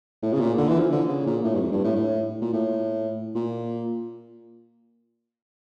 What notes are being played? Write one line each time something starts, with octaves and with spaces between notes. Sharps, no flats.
A2
C#3
A#2
D3
E3
F3
D3
C#3
A#2
A2
G2
F2
G2
A2
A2
A#2
A2
A#2